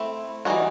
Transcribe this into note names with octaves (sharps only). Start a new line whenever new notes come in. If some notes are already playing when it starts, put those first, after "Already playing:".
Already playing: A3 C4 E4
E3 G3 C4 D#4 F#4